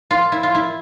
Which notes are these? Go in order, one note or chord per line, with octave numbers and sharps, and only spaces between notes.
F4
E4
F4
E4